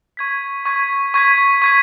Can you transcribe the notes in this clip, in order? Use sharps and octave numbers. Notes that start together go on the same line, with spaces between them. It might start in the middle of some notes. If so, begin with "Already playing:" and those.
C#6 G#6 B6
C#6 G#6 B6
C#6 G#6 B6
C#6 G#6 B6